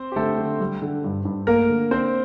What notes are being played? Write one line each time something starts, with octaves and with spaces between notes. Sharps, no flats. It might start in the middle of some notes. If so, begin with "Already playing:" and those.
Already playing: C4 C5
G4
D3 A3 A4
D3
G3
D3
G2
G2
A3 A#3 A#4
D3
C4 D4 C5